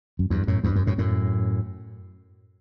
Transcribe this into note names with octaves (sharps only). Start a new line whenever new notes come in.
F#2
E2 G2
F#2 A2
E2 G2
F#2
F#2 A2
F#2 A2